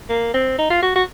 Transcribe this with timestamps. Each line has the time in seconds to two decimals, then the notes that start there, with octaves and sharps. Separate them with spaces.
0.09 A#3
0.34 C4
0.59 D#4
0.70 F4
0.83 F#4
0.96 F#4